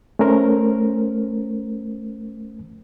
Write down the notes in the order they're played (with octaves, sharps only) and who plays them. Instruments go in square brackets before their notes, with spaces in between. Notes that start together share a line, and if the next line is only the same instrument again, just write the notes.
[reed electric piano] A3 C#4 A#4 C5